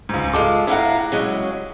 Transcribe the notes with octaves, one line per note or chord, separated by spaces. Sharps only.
C#2 G#2
G#3 F4 A4 D6
A2 E4 F5 F#5 A#5
C#3 F#3 G#3